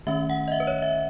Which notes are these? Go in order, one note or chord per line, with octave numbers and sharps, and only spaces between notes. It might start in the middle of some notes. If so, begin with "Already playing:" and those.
D#3 A3 C#4 E5
F#5
D#5
E5
B4
C#5
E5